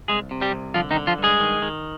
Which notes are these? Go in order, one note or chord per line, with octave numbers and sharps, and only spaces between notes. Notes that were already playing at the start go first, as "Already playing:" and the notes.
C2 G#3 G#4
C3
G3 G4
C2
D3 F3 F4
D#3 D#4
D3
F3 F4
G2
G#3 G#4
D#3
D#3